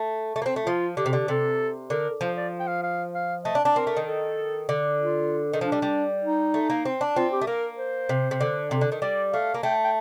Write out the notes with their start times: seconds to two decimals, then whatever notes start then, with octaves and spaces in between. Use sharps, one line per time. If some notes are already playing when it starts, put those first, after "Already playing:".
Already playing: A3
0.36 A3
0.42 A#3
0.46 C4
0.56 A3
0.66 F3 F4
0.97 D3 G4
1.06 C3
1.13 D3 G4
1.28 C3 A4
1.90 D3 A#4
2.21 F3 C5
2.37 D5
2.60 G5
2.68 F5
2.83 F5
3.14 F5
3.45 A3 D#5
3.55 D4
3.65 D4
3.76 C4 A#4
3.87 A3
3.97 D#3
4.07 A4
4.69 D3
4.99 F4
5.53 D#3
5.61 F3 D4
5.72 G3
5.82 G3
6.23 D#4
6.54 A3
6.70 A#3
6.85 C4
7.01 D4
7.16 C4 F4
7.32 G4
7.42 A3
7.47 A#3 A#4
7.78 C5
8.09 C3
8.31 C3
8.41 D3
8.71 C3
8.81 D3
8.92 D#3
9.02 G3 D5
9.33 A3 F5
9.54 A#3
9.63 A3 G5
9.84 G5